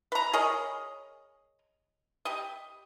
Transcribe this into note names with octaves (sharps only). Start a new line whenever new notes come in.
B4 A#5
G#4 A#4 C#5 D#5
G4 D#5